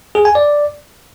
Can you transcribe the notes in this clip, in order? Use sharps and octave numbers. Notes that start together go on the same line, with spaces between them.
G#4
G#5
D5